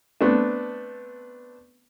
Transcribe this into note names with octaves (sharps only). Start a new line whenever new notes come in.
A3 B3 C4 D4